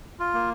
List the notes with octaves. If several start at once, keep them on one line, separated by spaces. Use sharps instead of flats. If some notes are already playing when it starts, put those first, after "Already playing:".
F4
A#3